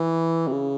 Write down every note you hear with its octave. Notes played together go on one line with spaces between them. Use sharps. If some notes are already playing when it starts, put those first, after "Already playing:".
Already playing: E3
C3
C#3